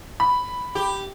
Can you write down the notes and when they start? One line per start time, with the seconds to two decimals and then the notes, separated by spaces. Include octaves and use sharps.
0.20 B5
0.75 G4